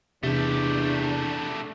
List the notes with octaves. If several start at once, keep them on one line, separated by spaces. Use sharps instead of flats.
E2 C3 A3 D4 G4